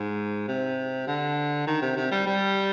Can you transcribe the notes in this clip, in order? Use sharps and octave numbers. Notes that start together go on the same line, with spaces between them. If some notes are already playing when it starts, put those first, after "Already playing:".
Already playing: G#2
C3
D3
D#3
C3
C3
G3
G3